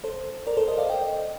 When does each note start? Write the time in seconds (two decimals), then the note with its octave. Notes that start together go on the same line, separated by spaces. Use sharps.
0.04 A4 C5
0.47 A#4 D5
0.57 A4 C5
0.68 C5 D#5
0.78 D5 F5
0.89 D#5 G5